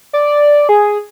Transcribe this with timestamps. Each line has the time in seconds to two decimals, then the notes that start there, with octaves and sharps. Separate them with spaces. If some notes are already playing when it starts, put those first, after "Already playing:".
0.13 D5
0.69 G#4